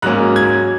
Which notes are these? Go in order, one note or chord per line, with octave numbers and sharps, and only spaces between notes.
G#2 F#3 A#3 C#4 F#6
G#6